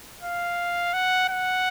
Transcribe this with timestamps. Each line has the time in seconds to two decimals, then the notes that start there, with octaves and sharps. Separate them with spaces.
0.23 F5
0.93 F#5
1.29 F#5